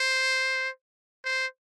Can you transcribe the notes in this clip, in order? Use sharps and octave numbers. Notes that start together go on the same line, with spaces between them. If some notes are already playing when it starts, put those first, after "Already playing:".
Already playing: C5
C5